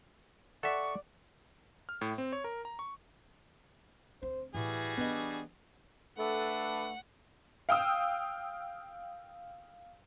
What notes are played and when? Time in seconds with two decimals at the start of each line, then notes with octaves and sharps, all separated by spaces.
0.63 A4 D5 E5 F#5 C#6
1.89 F6
2.01 A2
2.18 C4
2.33 C#5
2.44 A#4
2.65 A#5
2.79 C#6
4.22 D2 C4 C5
4.55 A2 E3 G3 F#4 G#4
4.97 E3 B3 D4 D#5
6.19 A3 D4 A4 B4 F#5
7.69 F5 G5 D#6 E6